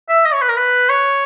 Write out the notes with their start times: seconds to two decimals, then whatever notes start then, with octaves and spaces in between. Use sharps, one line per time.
0.09 E5
0.26 D#5
0.33 C#5
0.42 B4
0.49 A#4
0.57 B4
0.90 C#5